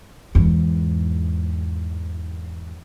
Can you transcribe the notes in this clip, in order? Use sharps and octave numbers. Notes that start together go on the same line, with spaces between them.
E2 G#2